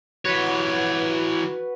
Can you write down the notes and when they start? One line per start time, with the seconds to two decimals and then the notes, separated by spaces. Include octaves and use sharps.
0.25 E3 F#4 B4 C#5